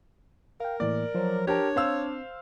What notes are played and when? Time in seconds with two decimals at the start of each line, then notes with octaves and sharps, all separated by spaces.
0.60 A#4 F5 G5
0.80 A2 E3 A#3 D5
1.15 F3 F#3 C5
1.47 D4 G4 A#4 C#5 A5
1.76 C4 C5 F5 E6